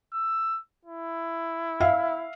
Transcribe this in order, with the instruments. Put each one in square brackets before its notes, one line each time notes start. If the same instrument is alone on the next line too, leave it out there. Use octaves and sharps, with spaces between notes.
[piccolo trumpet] E6
E4
[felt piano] E5 F5